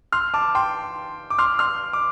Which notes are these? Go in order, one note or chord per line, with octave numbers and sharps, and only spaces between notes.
C6 F6
A5 D6
G5 C6
D6
C6 F6
C6 F6
D6